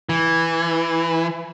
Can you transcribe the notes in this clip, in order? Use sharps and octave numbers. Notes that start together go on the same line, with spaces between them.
E3